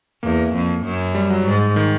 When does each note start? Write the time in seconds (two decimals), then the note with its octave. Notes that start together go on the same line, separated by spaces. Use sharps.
0.23 E2 A#3
0.54 F2
0.85 F#2
1.15 G3
1.30 F#3
1.45 G#2
1.76 D#3